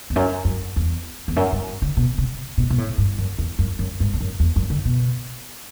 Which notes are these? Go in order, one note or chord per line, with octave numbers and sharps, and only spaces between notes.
E2
F#2
F#2
E2
E2
F#2
G2
D3
B2
C3
B2
B2
A2
G2
F#2
E2
F#2
F#2
G2
E2
F#2
E2
F#2
D3
B2